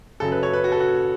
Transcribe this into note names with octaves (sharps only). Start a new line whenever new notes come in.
F#2 C#3 F#3 A4
B4
C#5
B4
F#4
A4
F#4